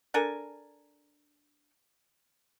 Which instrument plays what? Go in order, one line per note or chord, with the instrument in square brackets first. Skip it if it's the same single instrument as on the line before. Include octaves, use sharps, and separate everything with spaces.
[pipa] D4 A4 A#4 G#5